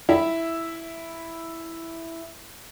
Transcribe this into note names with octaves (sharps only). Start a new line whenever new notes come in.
E4 E5